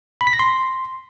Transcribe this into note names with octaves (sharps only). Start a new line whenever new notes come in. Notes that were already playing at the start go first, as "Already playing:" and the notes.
B5
B6
A#6
C6